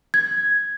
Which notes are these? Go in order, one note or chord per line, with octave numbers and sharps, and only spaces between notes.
G#6